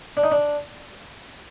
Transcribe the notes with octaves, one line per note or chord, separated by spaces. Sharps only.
D4
D#4
D4